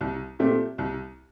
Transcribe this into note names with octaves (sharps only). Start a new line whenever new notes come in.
C2
A#2 A3 C4 G4
C2